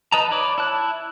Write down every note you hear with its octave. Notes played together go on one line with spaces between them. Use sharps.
D#4 B4 D#5 A5 A#5
C#5 D5 B5 D6
E4 A5 F#6